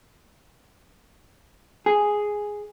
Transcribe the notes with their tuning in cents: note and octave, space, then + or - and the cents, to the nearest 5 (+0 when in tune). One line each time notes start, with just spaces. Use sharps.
G#4 +0